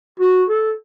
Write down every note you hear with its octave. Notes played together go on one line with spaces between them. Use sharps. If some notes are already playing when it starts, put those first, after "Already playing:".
F#4
A4